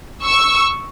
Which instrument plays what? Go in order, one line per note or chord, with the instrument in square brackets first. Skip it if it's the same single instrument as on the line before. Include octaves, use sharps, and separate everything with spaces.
[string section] C#6 E6